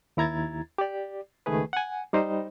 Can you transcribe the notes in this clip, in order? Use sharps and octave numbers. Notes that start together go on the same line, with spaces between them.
D#2 E4 A#5 G#6 A6
G4 D5
C#2 D#3 A3 G#4 B4
F#5 G#5
G3 D#4 C5 D#5